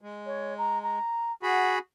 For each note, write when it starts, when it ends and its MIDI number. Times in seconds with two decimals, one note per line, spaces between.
0.01 0.99 56
0.26 0.56 73
0.58 0.81 82
0.83 1.32 82
1.43 1.79 66
1.43 1.79 68
1.43 1.76 78
1.43 1.79 83